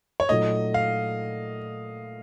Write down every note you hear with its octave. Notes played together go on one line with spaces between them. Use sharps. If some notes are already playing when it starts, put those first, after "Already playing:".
C#5
A#2 F#3 A3 D#4 D#5
F5